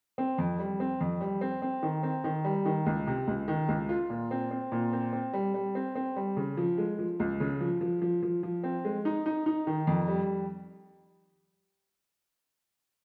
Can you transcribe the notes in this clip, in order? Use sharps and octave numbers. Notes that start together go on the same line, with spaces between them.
C4
F2
G3
C4
F2
G3
C4
C4
D#3
C4
D#3
G3
D#3
C#2
C3
C#2
D#3
C#2
F4
A#2
C4
C4
A#2
C4
C4
G3
G3
C4
C4
G3
C#3
F3
G#3
F3
C#2
C#3
F3
F3
F3
F3
F3
C4
G#3
D#4
D#4
D#4
D#3
F2
G3